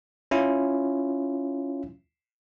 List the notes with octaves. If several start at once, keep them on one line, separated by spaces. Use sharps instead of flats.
C#4 E4 F4